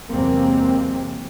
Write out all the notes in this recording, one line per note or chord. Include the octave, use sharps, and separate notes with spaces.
E2 C3 F#3 G#3 A#3 C4